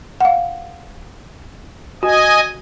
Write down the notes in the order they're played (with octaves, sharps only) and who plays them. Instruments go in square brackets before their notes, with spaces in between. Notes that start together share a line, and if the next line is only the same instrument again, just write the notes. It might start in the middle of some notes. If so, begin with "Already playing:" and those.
[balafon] F5 F#5
[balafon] F#4 [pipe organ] D#5 G#5